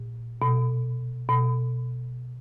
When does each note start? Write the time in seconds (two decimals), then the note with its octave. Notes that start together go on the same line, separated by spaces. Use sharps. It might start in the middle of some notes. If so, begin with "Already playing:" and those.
Already playing: A#2
0.42 B2
1.29 B2